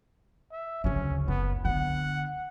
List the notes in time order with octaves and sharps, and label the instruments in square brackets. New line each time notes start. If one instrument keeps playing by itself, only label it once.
[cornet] E5
[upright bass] D2 C#3 [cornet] C#4
[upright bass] F#1 [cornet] B3
[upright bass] D3 B3 [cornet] F#5